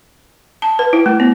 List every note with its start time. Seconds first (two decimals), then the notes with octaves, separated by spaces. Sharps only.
0.62 A5
0.79 B4
0.93 E4
1.06 A3
1.20 B3